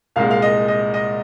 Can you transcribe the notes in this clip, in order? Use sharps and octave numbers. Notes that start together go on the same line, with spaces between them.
C2 A#2 G#3 F5
F5
D#5
D#5
D#5